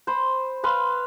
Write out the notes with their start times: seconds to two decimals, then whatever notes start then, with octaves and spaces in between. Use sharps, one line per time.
0.07 C5 B5
0.63 B4 F5 B5 C6